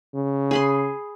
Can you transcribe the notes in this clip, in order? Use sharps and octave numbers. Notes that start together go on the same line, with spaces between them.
C#3
G#4 B5 C6